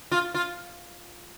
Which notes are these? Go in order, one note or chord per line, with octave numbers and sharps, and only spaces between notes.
F4
F4